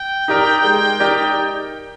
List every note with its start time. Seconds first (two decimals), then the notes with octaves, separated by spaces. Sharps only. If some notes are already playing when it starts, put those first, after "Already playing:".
Already playing: G5
0.28 D#4 G4 A#4 D5
0.64 G#3
1.00 D#4 G4 A#4 D5